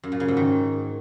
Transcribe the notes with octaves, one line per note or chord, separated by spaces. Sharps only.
F#2
A#2
C#3
G#2
D#3